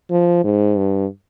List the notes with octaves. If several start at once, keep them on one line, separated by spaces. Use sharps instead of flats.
F3
G#2
G2